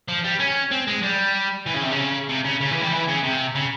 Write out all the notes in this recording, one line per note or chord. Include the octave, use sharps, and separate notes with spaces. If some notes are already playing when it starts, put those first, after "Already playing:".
F3
G3
C#4
C4
G#3
G3
E3
C#3
C3
C#3
C3
C#3
C#3
E3
G3
E3
C#3
C3
C#3